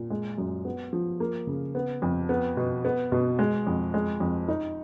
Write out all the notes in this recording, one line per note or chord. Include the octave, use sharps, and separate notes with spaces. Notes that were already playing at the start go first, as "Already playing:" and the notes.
Already playing: A#2
G#3
F#2
B3
F3
A#3
C#3
B3
F2
B3
B2
B3
B2
G#3
F2
G#3
F2
D#4